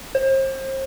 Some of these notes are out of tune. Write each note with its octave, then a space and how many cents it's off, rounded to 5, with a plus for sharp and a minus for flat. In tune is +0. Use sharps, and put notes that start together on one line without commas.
C5 +35